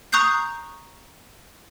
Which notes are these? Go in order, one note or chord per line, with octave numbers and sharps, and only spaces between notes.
A#5 C#6 D#6 F#6 G6 C7